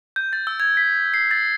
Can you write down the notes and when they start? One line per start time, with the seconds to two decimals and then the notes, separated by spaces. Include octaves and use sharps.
0.16 G6
0.33 A6
0.47 E6
0.60 G#6
0.77 B6
1.14 C7
1.31 A6